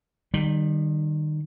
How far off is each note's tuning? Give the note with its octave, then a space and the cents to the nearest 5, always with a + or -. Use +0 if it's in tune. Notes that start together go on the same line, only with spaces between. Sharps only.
D#3 -30 G3 -5